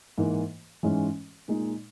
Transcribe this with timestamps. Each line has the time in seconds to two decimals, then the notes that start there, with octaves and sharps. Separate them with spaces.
0.18 G#2 E3 A#3
0.83 G#2 E3 G#3 C#4
1.48 A#2 G#3 D#4